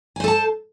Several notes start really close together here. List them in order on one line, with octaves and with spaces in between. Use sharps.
G#5 C5 A4 A5